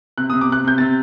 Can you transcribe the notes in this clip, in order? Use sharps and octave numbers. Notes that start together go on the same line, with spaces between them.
C3 F#6
D#6
C3
D6
C3 F#6
C3 G6
C3 A6